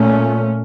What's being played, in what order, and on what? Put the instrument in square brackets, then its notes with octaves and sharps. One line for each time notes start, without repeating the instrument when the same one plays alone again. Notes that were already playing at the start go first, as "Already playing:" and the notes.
Already playing: [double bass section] A#2 A3 C#4